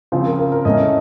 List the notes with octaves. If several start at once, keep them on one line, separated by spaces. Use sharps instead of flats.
C#3 F3 C4 C5
A#4
A#4
A#4
A2 A3 C#4 D#5